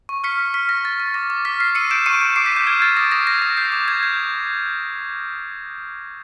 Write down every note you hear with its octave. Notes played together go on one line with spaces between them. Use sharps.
C#6
F6 B6 C#7
C#6
F6 B6
C#6 A#6
F6 A6
C#6
D6 A#6
D6
F6 B6
F6 C7
E6 C#7 D#7
G6 D7 E7
C#6 C#7 D#7
G6
D6 C7 D7
B6 C#7
D6 G6
F6 G#6
F6 A6
D#6 A#6
D#6 A#6
G6 A#6
D#6
G6 C7
D6
G6 G#6
G6